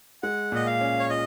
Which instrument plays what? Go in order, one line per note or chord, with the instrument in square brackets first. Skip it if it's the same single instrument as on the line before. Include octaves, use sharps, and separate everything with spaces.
[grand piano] G#3 [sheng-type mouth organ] F#5
[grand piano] A#2 [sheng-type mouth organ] D#5
[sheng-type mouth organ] F5
[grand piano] C#4
[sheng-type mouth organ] C#5
[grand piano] F4 [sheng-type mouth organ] D#5